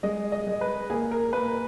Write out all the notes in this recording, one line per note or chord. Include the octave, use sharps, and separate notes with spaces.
G#3 D#5
D#5
G#3
B4
A#3 G#4
A#4
A#3 B4